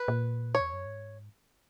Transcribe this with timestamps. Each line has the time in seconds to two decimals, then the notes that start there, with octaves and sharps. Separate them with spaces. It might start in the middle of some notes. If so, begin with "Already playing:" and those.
Already playing: B4
0.08 A#2
0.55 C#5
0.60 E2
0.73 F#2
0.86 G#2